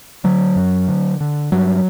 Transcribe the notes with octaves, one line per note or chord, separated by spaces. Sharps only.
D3 F#3
F#2
D3
D3
G2 F#3